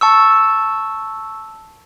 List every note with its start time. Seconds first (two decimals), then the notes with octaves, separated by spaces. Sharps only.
0.01 A5 C#6 E6